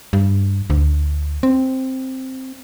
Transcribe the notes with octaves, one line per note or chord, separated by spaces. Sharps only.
G2
D2
C4